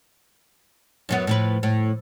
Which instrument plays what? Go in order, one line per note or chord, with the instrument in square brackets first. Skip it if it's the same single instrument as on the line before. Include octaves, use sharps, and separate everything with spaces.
[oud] F#2 F#3 B3
A2 F3 B4
A2